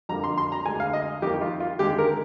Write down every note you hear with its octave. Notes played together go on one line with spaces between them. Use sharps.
F2 D3 G3 A#3 A#5
C6
C6
A#5
D2 D3 G#3 G#5
F5
D#5
F2 D#3 A#3 G4
F4
F4
D#2 D3 G#3 G4
A#4